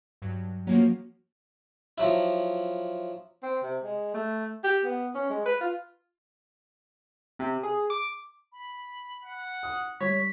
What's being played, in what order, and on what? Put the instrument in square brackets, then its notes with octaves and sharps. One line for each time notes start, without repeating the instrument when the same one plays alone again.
[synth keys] G2 F#3
[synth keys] F3 A#3 C#4 [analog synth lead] F#3
[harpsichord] F3 F#3 E4
[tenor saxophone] C4
C3
G#3
A3
G4
B3
C#4
G#3
B4
F4
[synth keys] C3
G#4
D6
[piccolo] B5
[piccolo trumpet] F#5
[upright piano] D#6
[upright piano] G3 [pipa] C#5 [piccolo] B6